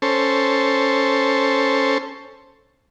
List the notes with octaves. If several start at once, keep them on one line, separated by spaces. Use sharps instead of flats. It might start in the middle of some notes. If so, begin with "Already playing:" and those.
C#4 A4 C5